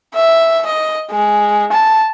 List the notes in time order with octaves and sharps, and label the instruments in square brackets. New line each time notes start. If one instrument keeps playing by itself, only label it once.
[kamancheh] E5
D#5
G#3
A5